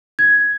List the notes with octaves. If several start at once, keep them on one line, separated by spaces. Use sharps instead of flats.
G#6